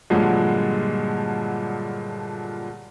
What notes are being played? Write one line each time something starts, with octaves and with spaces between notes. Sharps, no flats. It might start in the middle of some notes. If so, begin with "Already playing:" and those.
G2 A#2 D3 F3 F#3 G#3